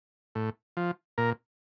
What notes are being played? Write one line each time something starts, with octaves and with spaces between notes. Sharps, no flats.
A2
F3
A#2 A#4